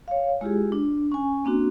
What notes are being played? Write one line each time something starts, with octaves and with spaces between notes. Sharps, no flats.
C#5 F5
G#3 E4 F4 G4 G#4
D4
C#4 G#5
A#3 C4 D4 F#4